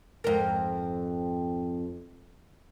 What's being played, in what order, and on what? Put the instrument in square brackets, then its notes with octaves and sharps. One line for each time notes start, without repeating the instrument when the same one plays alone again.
[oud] F2 G#2 A#4